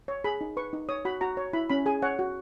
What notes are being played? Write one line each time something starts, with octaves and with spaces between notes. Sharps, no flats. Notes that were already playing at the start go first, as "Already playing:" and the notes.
C#5
G#4 B5
D#4
B4 C#6
D#4
C#5 D#6
F#4 B5
F#4 A#5
C#5
E4 B5
C#4 B5
G#4 G#5
C#5 F#5
F#4